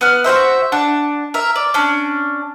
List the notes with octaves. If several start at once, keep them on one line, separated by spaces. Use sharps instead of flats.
B3 F#5 F6
F#4 G#4 C5 E5
D4 F#5
A#4 E5
D5
C#4 D4